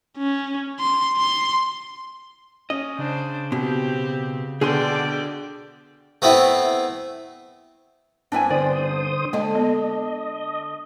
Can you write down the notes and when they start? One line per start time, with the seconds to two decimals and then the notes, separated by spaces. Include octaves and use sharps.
0.18 C#4
0.80 C6
1.17 C6
2.70 C#4 D#5
2.99 C#3 D4 C5
3.52 B2 C4 G4
4.61 B2 D3 D4 G#4 D5 G5 G#5 C6
6.22 A3 B3 C4 E4
8.32 G2 B3 C4 D4 E4 G#5
8.50 D3 C5 D5 D#6
9.33 D3 G#3 A#3 D4 D#5
9.55 B3 D#5